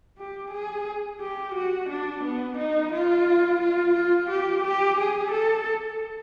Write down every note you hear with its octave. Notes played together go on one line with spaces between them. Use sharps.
G4
G#4
G4
F#4
D4
B3
D#4
F4
F4
F4
G4
G4
G#4
A4